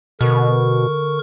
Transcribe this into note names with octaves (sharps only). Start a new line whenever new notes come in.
B2 D3 A#4 C#6